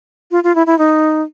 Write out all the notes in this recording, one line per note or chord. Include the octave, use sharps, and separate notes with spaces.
F4
F4
E4
E4
D#4